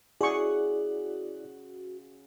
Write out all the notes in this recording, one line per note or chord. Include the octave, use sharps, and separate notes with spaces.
C#3 E4 F#4 G#4 D5 F#5 C#6